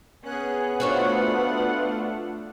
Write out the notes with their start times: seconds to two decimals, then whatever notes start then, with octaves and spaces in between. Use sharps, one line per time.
0.25 B3 C#4 G#4 F#6
0.80 A3 D4 F4 F#4 C5 C#5 F#5